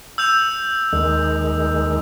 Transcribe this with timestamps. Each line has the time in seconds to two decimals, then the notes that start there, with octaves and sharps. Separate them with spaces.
0.18 E6 G6 F7
0.93 D#2 D#3 G#3